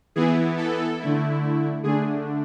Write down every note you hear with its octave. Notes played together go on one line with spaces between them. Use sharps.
E3 B3 E4 G#4
A4
D3 A3 E4
D3 A3 D4 G#4